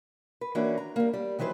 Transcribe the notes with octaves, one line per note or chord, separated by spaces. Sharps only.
B4
E3 A#3 C#4 D4 F#4
A#5
G3 A#3
G3
D#3 E3 F#3 B4 C5